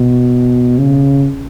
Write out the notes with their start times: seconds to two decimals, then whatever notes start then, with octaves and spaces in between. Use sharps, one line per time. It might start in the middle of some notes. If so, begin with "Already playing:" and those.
Already playing: B2
0.78 C#3